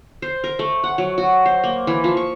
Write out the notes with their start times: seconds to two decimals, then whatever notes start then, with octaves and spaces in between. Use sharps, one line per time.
0.22 C5
0.44 A#4
0.59 A3
0.84 F#5
0.98 F#3
1.18 F#4
1.46 C5
1.63 A#3
1.87 E3
2.04 F3
2.17 C#6